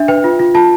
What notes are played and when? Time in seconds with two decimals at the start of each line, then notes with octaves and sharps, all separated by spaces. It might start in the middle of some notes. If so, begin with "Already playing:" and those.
Already playing: D4 E5
0.08 B4 G5
0.24 F4
0.40 F4
0.55 F4 A5